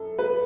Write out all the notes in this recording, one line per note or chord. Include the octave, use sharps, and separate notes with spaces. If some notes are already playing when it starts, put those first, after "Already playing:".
Already playing: F#2 A4
B4